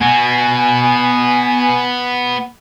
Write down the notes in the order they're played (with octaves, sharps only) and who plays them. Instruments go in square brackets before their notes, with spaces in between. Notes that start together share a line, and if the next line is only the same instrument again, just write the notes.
[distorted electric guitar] B3 F#4 [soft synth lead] G#5